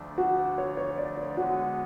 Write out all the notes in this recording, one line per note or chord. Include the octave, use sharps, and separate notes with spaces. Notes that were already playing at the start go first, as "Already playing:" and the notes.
Already playing: D2 D3 F3 A3 D4
F#4
C#5
C#5
D5
C#5
D3 G#3 B3 F#4